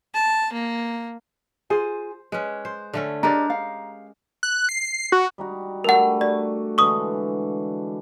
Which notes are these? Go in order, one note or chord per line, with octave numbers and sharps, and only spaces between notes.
A5
A#3
F4 G#4 C5 G#5
G#3 C#4 B4
C5
D3 A3 C#4
G#3 D4 G4 A#4 D5 A#5
F5
F#6
C7
F#4
G3 D#4 F#4
G3 A3 D4 A#4 F#5
F#4 D5
D3 E3 G#3 C#6 D#6